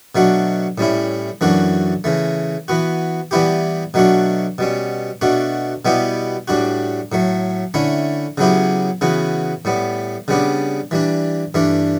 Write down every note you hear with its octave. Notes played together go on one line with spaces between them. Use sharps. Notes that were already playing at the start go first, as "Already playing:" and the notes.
B2 F#3 A3 D4 F#4
A2 G3 C#4 E4
F#2 E3 A3 D4 F#4
C#3 E3 A3
E3 B3 F#4
E3 G3 B3 E4 G4
B2 F#3 A3 D4 F#4
B2 G3 C#4
B2 A3 D4 F#4
B2 G3 B3 E4 G4
A2 G3 D4 F#4
A2 F#3 A3
D3 A3 C#4 E4
C#3 F#3 B3 E4 G4
C#3 E3 B3 F#4
A2 G3 B3
C#3 G3 B3 D4
E3 G3 D4
G2 E3 A3 D4